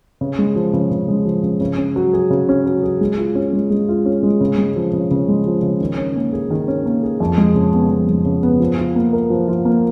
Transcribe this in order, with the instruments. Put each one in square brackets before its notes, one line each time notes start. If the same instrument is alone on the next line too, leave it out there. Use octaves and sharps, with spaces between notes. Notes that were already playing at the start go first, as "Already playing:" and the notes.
[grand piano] C#3
G#3
F3
C#3
C#3
G#3
F3
C#3
C#3
C#4
F#3
G#4
C#3
C#4
F#3
G#4
G#3
F4
C#4
G#3
G#3
F4
C#4
G#3
C#3
G#3
F3
C#3
C#3
G#3
F3
C#3
D#3
C#4
A#3
G#4
D#3
C#4
A#3
G#4
F2
G#3
C#3
B3
F2
G#3
C#3
B3
F3
F4
A#3
A#4
F3
F4
A#3